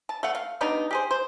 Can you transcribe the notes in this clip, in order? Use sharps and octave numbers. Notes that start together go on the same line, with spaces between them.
A5
A3 F5 F#5
F5
G3 B3 D4 D#4
G4 G#4 C5
C5